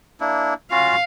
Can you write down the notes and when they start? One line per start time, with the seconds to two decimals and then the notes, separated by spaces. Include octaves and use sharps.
0.20 A#3 D4 E4
0.71 C#4 F4 F#4 F5